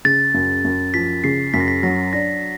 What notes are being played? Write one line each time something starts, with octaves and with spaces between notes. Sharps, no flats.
C#3 A6
F#2
F#2
F3 B6
C#3 C7
F#2 B6
A#6
B6
F#3 A#6
D4 A#6